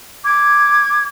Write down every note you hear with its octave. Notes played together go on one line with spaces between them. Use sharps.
D6 G#6